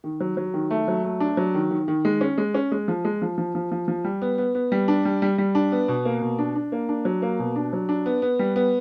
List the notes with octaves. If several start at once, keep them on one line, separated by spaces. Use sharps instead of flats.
D#3
F#3
F#3
D#3
A3
F#3
A3
D4
F#3
D#3
D#3
D#3
G#3
C#4
G#3
C#4
G#3
F3
G#3
F3
F3
F3
F3
F3
G3
B3
B3
B3
G3
D4
G3
G3
G3
D4
B3
B2
A#3
B2
D4
D4
A#3
D4
F#3
A#3
B2
D4
F#3
D4
B3
B3
G3
B3